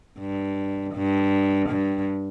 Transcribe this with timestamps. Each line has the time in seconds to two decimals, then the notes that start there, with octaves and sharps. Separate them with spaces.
0.19 G2
0.94 G2
1.69 G2